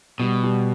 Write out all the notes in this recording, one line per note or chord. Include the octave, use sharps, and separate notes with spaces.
B2 G3
G3